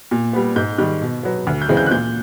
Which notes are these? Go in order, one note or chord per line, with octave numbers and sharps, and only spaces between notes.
A#2
G3 B3
G#2 G6
D#3 G3
B2
F#3 B3
D2
G6
C#3 E3 G#3 C4
G6
F#6
A#2 G6